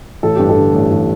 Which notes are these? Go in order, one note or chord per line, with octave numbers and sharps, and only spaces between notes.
A1 A4
G2 G4
A4
D3
A1
A1